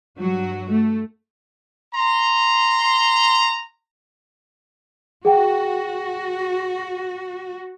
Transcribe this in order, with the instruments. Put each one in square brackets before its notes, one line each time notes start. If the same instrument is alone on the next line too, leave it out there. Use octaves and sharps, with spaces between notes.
[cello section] G2 F#3 F#4
A3
[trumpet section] A#5 C6
[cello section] F#4 [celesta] G#4 F#5 G5